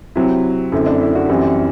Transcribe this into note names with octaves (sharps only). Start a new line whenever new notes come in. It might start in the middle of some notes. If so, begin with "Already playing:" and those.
C3 F#3 C4 E4
F#2 D3 A3 C4 E4
D4
E4
D4 F#4
F#2 E3 G3 C4